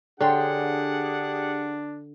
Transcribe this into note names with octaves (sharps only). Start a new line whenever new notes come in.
D3 D4 G4 G#4 C#5 F#5 G5 C6